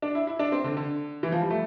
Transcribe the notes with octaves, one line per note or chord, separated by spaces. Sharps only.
D4
E4
E4
D4
C4
D3
D3
E3
F3
G3
A3